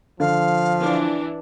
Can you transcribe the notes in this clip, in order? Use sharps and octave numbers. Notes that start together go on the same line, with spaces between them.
D3 F3 F5
E3 D4